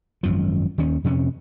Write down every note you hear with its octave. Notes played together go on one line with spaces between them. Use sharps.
G#1 F#2 F3
D#2 D#3 C#4
F2 C3 C4 C#4